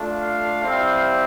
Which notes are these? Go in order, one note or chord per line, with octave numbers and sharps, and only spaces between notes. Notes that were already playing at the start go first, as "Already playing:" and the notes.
Already playing: A3 D4 F4
F5
G3 C4 E4